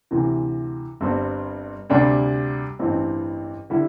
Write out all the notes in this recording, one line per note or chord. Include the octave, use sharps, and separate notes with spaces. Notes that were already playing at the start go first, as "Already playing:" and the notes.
D2 C3 E3
G1 G2 G3 C4
D2 C3 G3 D4
A1 G2 E3 C4
D3 G3 E4